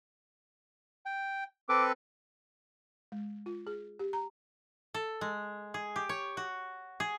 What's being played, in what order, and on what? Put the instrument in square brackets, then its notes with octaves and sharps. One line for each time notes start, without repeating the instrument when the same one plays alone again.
[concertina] G5
[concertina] C4 A4 B4 [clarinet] D6
[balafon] G#3
F4
G#4
G4
A#5
[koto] A4
G#3
G#4
G4
C#5
F#4
G#4